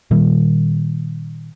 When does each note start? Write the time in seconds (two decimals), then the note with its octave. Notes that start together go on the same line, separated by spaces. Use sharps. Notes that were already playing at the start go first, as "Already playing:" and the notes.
0.11 A#2 D#3 G3